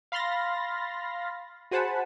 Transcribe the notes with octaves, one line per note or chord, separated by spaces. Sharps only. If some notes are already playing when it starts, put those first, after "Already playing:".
F5 B5 C6 F6 A6 A#6
F#4 G#4 C5 F#5 A5 B5